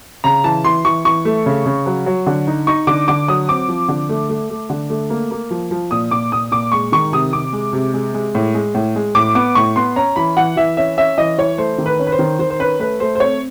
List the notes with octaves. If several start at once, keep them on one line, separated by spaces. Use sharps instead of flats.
C#3 A#5
E3 A5
E3 C6
E3 C#6
E3 C#6
A3
C#3
C#3
F#3
F#3
D3
D#4
D#4 C#6
D3 D6
D3 D6
F#3 D#6
C4 D6
F3
D3
A3
A3
A3
D3
A3
A#3
A#3
F3
F3
A#2 D#6
A#2 D6
A#2 D#6
A#2 D6
G#3 C#6
D#3 C#6
C3 D#6
C3 D6
G#3
C3
G#3
G#3
A2
G#3
A2
G#3
A2 D6
B3 D6
A2 C#6
B3 C6
C#4 A#5
E3 B5
E3 F#5
E3 E5
C#4 E5
C#4 E5
E3 D#5
E3 C#5
A3 C5
D#3
B4
C#4
B4
C5
D#3
D#3 C5
C5
C#4 B4
A3 B4
A3 C5
C5
C4 C#5